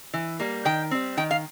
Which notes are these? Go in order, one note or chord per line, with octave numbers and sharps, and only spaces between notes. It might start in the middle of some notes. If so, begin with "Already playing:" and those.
E3
G3 A#3
D#3 G5
G3 C4
D#3 G5
F5